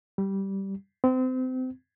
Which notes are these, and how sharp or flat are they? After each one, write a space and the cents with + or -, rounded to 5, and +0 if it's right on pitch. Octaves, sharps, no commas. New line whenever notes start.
G3 -10
C4 -30